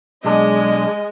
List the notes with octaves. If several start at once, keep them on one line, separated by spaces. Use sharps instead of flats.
B1 G#3 D4 D#5